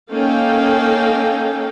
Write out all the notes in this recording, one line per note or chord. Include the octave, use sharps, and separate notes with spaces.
A#3 C#4 D#4 A4 F5 G5